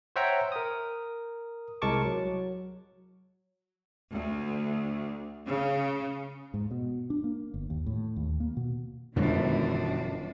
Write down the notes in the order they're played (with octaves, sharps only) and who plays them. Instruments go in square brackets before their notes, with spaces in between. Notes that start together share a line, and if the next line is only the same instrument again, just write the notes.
[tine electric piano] C5 C#5 E5 F#5 G5 A#5
A#4 D#6
C2 G#3 A#4 A5 C#6 D6
F#3
[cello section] D2
C#3
[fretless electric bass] G#2
B2
D4
A#3
G1
D#2
A2
D#2
A#3
B2
[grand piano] G1 [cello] F#2 D4 [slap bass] B2 G3 [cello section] D#3 E3 G#3